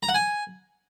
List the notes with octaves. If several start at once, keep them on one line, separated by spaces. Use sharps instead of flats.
A#5
F#5
G#5